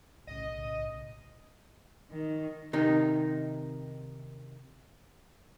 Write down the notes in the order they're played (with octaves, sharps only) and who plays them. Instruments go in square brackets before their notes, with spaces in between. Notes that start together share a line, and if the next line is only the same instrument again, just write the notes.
[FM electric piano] B1 A2 C#3 [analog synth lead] D#5
[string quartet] D#3
[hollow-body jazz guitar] C3 D#3 D#4